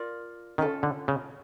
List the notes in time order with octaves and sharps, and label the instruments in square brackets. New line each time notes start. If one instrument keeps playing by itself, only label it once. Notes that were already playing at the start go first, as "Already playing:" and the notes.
Already playing: [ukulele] F4 A#4 D5
[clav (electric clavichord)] D#3 [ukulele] C#4 F4 A4
[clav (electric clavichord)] D3
C#3